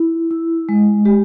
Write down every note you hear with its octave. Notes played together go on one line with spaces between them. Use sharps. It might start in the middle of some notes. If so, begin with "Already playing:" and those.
Already playing: E4
E4
G#3
G#3 G4